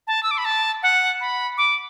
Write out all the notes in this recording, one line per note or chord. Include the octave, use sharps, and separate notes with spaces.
A5
E6
D6
B5
A5
F#5
B5
D6